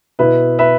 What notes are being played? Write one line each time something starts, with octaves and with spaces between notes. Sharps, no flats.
B2 B3 E4 B4 E5
B4 E5